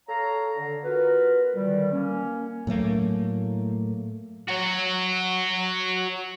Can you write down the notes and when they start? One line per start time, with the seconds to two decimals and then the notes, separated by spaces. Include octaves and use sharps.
0.09 A4 C#5 F5 A#5
0.57 D3
0.84 B3 F4 F#4 A#4 B4
1.55 A#2 D3 D#3 G3
1.92 A#3 C#4
2.67 A2 F#3 A3 A#3
4.48 F#4 C#5